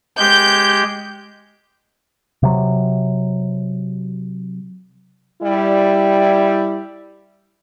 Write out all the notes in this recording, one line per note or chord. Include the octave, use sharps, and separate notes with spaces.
G#3 G4 G6
C3 F#3
G3 E4